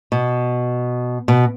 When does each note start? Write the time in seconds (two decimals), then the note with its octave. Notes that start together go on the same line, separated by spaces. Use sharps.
0.12 B2
1.28 B2